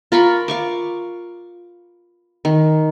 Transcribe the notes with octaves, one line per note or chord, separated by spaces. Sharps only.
F4 A#4 B5 C#6
F5 C#6 D6
D#3